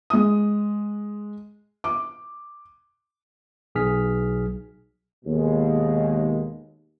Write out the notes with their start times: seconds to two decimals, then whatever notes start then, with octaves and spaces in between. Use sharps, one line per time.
0.10 G#3 D#6
1.84 D6
3.75 B1 G#4 F6 B6
5.25 D#2 B2 G#3